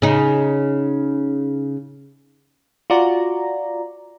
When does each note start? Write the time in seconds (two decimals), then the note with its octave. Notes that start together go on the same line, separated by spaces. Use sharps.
0.02 C#3 D#4
2.90 F4 F#4 D5 A#5